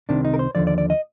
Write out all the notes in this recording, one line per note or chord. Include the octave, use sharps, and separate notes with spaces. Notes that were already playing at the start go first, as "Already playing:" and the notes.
C2 C3 D#3 D4
D#4
A#4
C5
D#2 D3 F3 D5
D5
D5
D#5